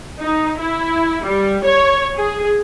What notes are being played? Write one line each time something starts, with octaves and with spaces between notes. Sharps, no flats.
D#4
E4
G3
C#5
G#4